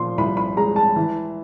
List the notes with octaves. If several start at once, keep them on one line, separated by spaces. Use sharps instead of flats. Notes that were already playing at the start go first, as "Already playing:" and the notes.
Already playing: A#2 F3 C6
C2 B5
B5
G#3 A#5
A5
E3